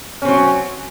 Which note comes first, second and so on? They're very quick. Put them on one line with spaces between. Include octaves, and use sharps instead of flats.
C#4 C4 F#3